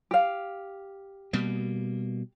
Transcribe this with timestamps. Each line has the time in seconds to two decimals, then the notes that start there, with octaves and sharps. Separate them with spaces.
0.11 G4 F5
1.33 B2 G3 A#3